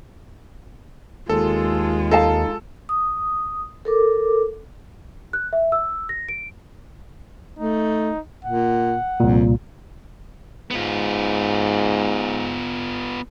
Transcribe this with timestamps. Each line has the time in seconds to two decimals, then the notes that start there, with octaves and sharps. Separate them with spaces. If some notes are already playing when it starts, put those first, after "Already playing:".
1.29 D#2 G#3 F4 A4
2.11 D#4 A4 F5 A5
2.89 D#6
3.85 A4 A#4 D6
5.33 F#6
5.53 E5
5.72 E6
6.09 A#6
6.29 D7
7.59 A3 D#4
8.45 A#2 F#5
9.20 C2 F2 A#2
10.71 G#2 B3 F4